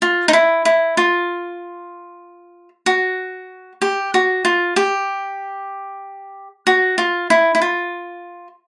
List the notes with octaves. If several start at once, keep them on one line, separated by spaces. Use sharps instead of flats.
F4
D#4
E4
E4
F4
F#4
G4
F#4
F4
G4
F#4
F4
E4
E4
F4